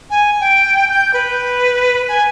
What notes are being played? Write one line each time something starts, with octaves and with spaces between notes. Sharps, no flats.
G#5
G5
G6
B4
G#5